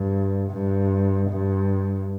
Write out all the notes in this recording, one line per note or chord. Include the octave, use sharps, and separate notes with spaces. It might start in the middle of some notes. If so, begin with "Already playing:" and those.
Already playing: G2
G2
G2